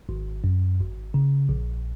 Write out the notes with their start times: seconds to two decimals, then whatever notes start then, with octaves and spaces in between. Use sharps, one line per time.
0.09 G#1
0.44 F#2
0.79 G#1
1.14 C#3
1.49 A#1